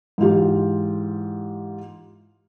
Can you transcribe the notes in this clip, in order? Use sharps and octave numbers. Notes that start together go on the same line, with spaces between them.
G#2 E3 F4 G4